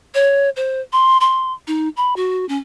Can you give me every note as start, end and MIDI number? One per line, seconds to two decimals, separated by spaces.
0.14 0.50 73
0.56 0.81 72
0.93 1.18 84
1.21 1.53 84
1.67 1.89 63
1.97 2.14 83
2.16 2.47 66
2.49 2.57 61